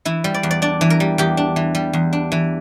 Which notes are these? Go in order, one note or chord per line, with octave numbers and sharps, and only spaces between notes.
E3 E4
G3
D5
E2
D5
D4 D5
E3
A#4
G3
E2 G4
D4
E3
G3
E2
D4
E3